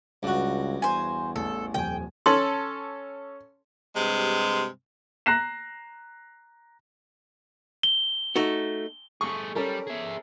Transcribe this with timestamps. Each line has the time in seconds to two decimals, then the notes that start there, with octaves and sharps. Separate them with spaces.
0.23 C#2 G2 F#4
0.82 E2 C5 G#5
1.36 A1 A4
1.74 D#1 F2 G5 G#5
2.26 C#4 A4 C6
3.96 G2 C3 G#3
5.26 A#5 F#6 A#6 C7 E7
7.83 G7
8.36 A3 D#4 F#4
9.21 A3 G#4 C#6
9.55 G3 C#4 A4 A#4
9.87 G#4 E5